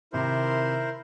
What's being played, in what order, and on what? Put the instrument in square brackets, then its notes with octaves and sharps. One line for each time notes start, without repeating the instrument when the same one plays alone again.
[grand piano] C3 D#3 [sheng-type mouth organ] E4 A#4 C5